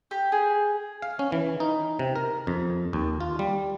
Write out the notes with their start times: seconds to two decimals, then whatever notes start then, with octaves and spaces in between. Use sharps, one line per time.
0.11 G4
0.32 G#4
1.02 F5
1.19 C#4
1.32 E3
1.60 D#4
1.99 C3
2.16 A#4
2.47 F2
2.93 D#2
3.20 F4
3.39 G3